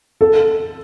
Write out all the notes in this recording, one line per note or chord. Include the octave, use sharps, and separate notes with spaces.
A4